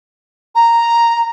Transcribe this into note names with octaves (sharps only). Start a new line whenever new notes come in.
A#5